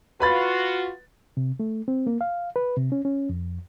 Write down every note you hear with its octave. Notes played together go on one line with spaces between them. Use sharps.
F4 F#4 B4 B5 A6
C3
A3
C4
A#3
F5
B4
C3
C#4
C#4
F2